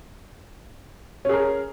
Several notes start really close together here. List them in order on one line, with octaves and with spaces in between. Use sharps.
C#4 G#4 A#4